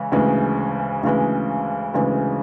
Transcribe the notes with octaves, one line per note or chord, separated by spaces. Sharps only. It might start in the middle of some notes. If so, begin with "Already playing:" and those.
Already playing: C#3 E3 G#3
D2 C#3 E3 G#3
D2 C#3 E3 G#3
D2 C#3 E3 G#3